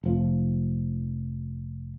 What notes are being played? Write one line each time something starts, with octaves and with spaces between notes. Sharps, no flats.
F1 F3